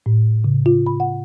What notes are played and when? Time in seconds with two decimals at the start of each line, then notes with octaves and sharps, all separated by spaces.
0.06 A2
0.44 C#3
0.66 F4
0.86 B5
1.00 F#5